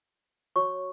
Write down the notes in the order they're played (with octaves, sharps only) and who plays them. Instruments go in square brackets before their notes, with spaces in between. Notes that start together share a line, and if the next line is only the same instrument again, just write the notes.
[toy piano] F#4 C#5 C#6